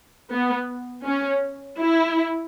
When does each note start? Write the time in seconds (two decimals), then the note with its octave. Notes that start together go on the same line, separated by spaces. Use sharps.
0.30 B3
1.04 C#4
1.78 E4